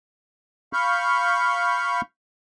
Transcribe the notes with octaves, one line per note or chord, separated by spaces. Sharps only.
F5 B5 C#6 F6 G6